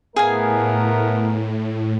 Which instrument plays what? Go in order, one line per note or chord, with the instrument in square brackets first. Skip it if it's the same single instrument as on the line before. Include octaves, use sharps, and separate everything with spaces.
[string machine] A2 [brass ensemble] A3 B3 A#4 [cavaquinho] G#4 F5 G#5